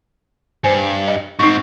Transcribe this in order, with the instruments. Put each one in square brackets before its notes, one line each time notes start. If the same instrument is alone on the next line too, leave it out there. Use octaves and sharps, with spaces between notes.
[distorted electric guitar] G2 [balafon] C5 G#5
[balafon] D#5
[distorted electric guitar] G#2 C4 [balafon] D#4 C#6